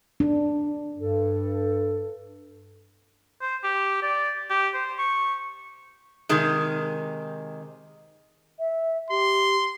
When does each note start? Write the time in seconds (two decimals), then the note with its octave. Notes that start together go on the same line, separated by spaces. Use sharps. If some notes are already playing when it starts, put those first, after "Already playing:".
0.20 D4
0.98 G2 A4
3.41 C5
3.64 G4
4.02 D5
4.50 G4
4.74 C5
4.98 C#6
6.29 C3 D#3 G#3
8.59 E5
9.10 G4 C6